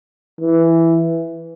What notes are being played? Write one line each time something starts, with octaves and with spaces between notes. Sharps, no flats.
E3